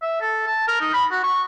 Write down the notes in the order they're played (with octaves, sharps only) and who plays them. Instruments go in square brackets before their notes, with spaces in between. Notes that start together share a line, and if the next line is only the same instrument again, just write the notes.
[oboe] E5
A4
A5
A#4
D#4
B5
F#4
C#6